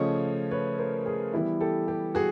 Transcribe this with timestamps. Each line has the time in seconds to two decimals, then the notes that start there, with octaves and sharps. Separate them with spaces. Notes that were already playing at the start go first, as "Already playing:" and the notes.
Already playing: C#3 F3 A3 C#4 C#5 D#5
0.51 B4 C#5
0.78 A#4 C5
1.06 G#4 A#4
1.33 E3 G3 B3 E4
1.60 G4 A4
1.88 G4
2.15 F#4 G#4